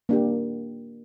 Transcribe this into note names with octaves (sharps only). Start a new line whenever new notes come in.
A#3 D4 G4